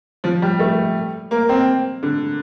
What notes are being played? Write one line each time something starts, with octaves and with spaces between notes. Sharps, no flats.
F3
G3
A3
A#3
C4
D3